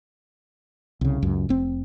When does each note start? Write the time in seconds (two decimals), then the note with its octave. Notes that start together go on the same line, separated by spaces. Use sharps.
1.01 C2 C#3
1.22 C#2 F#2
1.49 F1 C4